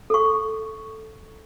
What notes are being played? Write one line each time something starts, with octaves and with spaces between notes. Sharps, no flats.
A4 C#6